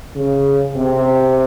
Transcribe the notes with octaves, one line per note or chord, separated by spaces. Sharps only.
C#3
C3